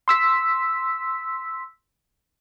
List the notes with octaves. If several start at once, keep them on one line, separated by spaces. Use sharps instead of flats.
C6 E6 B6